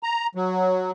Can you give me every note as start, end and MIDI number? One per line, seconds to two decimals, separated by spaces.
0.03 0.27 82
0.35 0.91 54